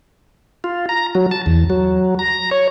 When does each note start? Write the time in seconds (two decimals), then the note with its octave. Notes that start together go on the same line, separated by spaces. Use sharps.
0.64 F4
0.89 A#5
1.15 F#3
1.31 A5
1.46 E2
1.70 F#3
2.19 A#5
2.51 C#5